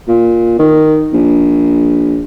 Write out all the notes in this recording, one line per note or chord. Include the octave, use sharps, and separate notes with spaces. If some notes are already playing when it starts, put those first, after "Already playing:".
A#2
D#3
A#1